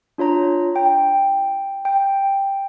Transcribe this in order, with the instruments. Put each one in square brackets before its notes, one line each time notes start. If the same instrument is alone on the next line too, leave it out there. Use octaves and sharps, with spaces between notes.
[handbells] D4 F4 C#5 A#5
G5
G5